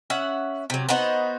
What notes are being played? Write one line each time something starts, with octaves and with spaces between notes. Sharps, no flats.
C#4 E5 F#5
C3 F#3
B3 D#4 F#4 C5